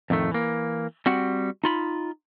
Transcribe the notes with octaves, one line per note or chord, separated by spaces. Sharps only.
F2 A2 D#3 A3
E3 A#3
G3 C4 F#4 F#5
D#4 F4 B5